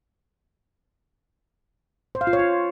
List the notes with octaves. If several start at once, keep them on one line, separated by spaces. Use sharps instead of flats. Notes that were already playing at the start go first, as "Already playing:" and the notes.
C5
F5
F4
C#5
F4